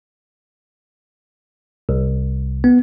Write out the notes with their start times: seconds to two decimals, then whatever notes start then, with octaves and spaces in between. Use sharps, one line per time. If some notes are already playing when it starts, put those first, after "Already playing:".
1.89 C2
2.64 B3